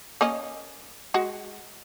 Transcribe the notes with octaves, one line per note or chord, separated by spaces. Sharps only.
A#3 C#4 D#5
G#3 F#4